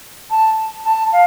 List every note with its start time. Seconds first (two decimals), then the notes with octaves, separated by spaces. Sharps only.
0.30 A5
0.84 A5
1.12 F5